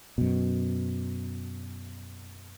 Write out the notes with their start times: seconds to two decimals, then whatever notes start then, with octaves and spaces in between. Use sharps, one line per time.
0.18 F#2 B2